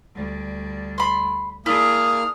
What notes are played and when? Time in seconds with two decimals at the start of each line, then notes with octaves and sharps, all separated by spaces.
0.15 D2 G3
0.98 B5 C6
1.66 A#3 D4 E4 G#4 D#6 F6